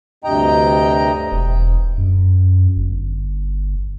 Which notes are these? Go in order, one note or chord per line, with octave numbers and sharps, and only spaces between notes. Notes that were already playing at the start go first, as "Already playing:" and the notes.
D2 G2 C3 D#5 G5 A#5
E1
F#2
G1